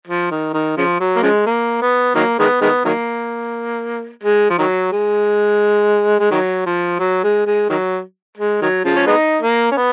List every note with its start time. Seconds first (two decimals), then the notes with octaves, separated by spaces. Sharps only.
0.07 F3
0.31 D#3
0.54 D#3
0.77 C#3 F3
1.00 F#3
1.16 A#3
1.23 C#3 F3 G#3
1.46 A#3
1.82 B3
2.15 D#3 F#3 A#3
2.39 D#3 G#3 B3
2.61 D#3 G#3 B3
2.85 D#3 F#3 A#3
4.23 G#3
4.50 F3
4.58 D#3 F#3
4.92 G#3
6.19 G#3
6.31 D#3 F#3
6.66 F3
6.99 F#3
7.23 G#3
7.46 G#3
7.69 D#3 F#3
8.37 G#3
8.61 D#3 F#3
8.85 C#3 F3
8.95 C#4
9.07 G#3 B3 D#4
9.42 A#3
9.71 C#4
9.77 B3